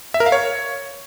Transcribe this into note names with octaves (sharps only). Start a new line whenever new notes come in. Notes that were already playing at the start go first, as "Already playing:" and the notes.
E5
A#4
F5
C#5